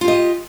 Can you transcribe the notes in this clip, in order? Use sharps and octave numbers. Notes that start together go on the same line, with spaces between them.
F4 G4 D#5